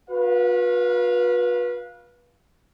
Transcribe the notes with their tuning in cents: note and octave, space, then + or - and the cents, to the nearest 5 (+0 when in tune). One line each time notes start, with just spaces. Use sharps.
F#4 -45 B4 -25 F5 +0